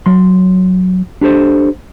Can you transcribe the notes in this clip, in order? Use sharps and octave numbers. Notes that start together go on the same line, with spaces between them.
F#3 C6
D4 G4 A4 C5